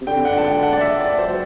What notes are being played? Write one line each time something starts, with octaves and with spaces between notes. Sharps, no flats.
C3
D3 G5
F#5
A5
G5
F#5
D5
E5
D5
F#3 C5